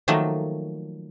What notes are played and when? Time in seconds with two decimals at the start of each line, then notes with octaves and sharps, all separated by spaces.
0.08 D#3 F3 F#3 A3 A#3